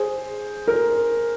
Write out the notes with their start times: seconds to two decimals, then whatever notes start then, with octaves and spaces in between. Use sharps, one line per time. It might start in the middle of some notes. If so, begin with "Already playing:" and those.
Already playing: G#4 C5
0.68 A#4